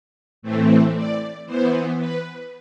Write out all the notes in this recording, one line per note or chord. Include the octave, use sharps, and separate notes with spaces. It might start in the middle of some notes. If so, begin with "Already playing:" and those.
A2 E3 A3 C4
D5
E3 B3 C5
B4